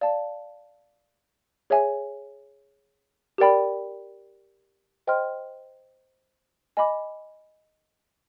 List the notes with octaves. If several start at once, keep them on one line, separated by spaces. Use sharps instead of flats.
D5 F5 A5
G#4 C#5 E5 G#5
G4 A#4 D5 G5 B5
C5 D#5 G5 C6 F6
D#5 G#5 B5 D6